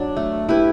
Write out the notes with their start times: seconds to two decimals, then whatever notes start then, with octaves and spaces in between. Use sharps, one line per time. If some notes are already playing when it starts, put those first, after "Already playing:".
Already playing: F#3 D4
0.17 A3
0.49 E4 G4 B4